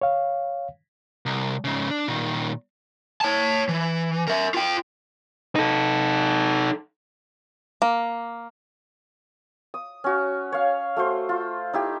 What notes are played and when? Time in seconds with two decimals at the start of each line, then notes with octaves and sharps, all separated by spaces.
0.02 C#5 F5
1.26 C2
1.64 G#2 C#3
1.90 D4
2.08 A#2 D#3
3.21 C#5 A5
3.69 E3
4.28 A#4 E5
4.54 F4 G5
5.55 D#4 A4
7.82 A#3
9.74 D#6
10.04 C#4 F#4
10.52 C#5 F5
10.97 A3 F#4 C5
11.29 F4
11.73 D#4 E4 G4